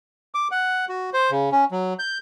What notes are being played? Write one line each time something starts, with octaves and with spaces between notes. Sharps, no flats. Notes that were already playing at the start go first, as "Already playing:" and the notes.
D6
F#5
F#4
C5
C#3
C#4
F#3
G6